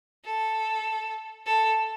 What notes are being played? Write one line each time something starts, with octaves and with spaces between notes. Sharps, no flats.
A4
A4